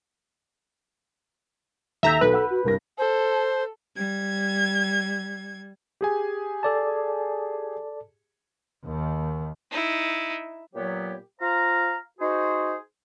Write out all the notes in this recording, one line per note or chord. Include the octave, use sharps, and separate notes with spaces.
D#2 A4 E5 A#5 G6
B1 A4 B4
F#5 E6
F#4
C2 G2 A#4 A#6
A4 C5
G3 G#6
G4 G#4 G#5
A4 D5 A5
D#2 D#3
D#4 E4
A#2 F#3 B3 G4 C#5
F4 C5 F5 A#5
D#4 F#4 G#4 C5